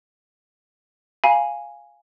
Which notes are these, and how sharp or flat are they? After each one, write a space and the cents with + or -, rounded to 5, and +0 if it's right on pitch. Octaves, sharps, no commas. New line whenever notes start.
F5 +0 G#5 +0 B5 -45